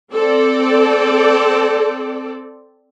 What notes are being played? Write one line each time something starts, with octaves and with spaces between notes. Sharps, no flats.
C4 A4 D5